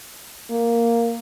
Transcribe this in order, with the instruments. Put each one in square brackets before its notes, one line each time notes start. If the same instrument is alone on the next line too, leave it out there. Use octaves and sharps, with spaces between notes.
[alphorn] A#3